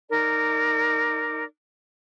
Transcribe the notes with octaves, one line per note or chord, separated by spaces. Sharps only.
D#4 A#4 D5